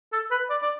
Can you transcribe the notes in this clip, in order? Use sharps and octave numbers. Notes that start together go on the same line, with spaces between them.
A4
B4
D5
D5